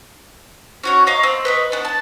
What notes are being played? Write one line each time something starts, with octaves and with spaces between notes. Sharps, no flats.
C#4 F#4 C#5
D#5 F5 A#5
C4
B4 D#5 C#6
B3 D4
A5